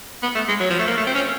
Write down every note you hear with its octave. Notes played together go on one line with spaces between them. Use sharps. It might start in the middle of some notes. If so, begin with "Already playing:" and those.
B3
A3
G#3
F#3
F3
A3
A#3
A3
C4
C#4